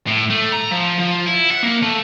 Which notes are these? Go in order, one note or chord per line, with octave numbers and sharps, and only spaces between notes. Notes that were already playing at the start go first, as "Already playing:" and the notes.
A2
A3
A#5
F3
F3
E4
F#5
A#3
A3